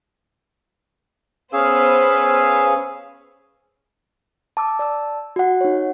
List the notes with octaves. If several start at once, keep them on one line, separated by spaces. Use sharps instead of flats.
B3 C#4 G#4 B4 C5 F5 E6
A5 D6 E6
D5 A5 E6
F#4 F#5
D#4 C#5